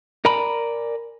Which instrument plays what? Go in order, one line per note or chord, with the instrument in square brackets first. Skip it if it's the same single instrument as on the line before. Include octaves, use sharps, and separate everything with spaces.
[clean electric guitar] A#4 D5 G#5 A#5 B5